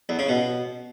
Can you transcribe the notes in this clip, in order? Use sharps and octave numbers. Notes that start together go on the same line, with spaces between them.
E2
C#3
B2